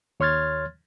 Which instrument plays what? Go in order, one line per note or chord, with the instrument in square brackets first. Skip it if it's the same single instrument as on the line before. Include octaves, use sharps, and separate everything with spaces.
[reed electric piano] D#2 C#5 C6 F6 G#6 A6